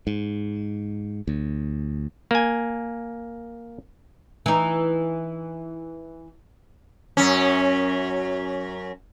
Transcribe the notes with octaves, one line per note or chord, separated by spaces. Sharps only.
G#2
D2
A#3 G#5
E3 D#4
F#2 C#4